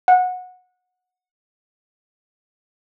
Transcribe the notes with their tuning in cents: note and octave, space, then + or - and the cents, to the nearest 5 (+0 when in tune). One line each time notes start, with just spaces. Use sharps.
F#5 -20